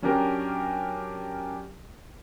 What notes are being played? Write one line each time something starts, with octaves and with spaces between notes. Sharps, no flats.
F#3 C#4 D4 G4 A#4